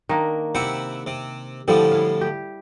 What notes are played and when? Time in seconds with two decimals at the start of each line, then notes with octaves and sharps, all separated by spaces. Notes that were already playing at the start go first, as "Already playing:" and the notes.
0.09 D#3 A#3 D4
0.55 C3 E4 G4 F#5
1.07 C3
1.68 A2 D3 F3 G3
1.92 E4 F5
2.21 G4